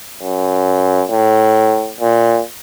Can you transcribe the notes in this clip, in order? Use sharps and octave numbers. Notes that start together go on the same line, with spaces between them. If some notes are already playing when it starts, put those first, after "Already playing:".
F#2
A2
A#2